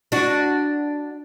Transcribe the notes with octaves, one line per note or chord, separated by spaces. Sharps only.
D4 F#4